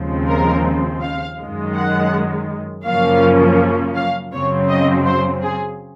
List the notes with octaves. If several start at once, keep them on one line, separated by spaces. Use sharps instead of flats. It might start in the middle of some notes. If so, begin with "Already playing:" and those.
Already playing: D#2 C#3 F3 G#3 C4
A#4
F5
F#2 D#3 G#3
F#5
F#2 C#3 F3 A#3 C#4 F5
F5
F#2 C#3 F#3 C4 C#5
D#5
C5
G#4